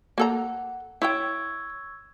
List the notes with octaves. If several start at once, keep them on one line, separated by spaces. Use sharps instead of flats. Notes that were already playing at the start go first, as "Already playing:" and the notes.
A#3 A4 F#5 A#5
E4 C#5 G5 C#6 E6 G#6